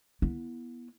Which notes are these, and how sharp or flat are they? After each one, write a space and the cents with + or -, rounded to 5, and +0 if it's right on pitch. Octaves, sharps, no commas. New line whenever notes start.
B3 -20 E4 +0